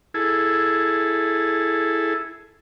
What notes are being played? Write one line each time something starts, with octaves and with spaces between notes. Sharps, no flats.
E4 G#4 A4